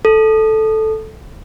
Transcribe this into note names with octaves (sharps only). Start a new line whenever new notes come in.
A4